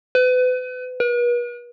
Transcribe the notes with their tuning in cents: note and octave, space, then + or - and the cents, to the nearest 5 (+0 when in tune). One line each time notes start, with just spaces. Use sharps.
B4 +35
B4 -40